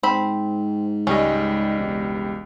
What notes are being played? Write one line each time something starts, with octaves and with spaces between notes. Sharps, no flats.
G#2 C4 B5
C#2 G3 C#4 D#5
E1